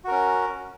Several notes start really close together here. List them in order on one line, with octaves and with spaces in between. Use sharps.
F#4 A#4 C#4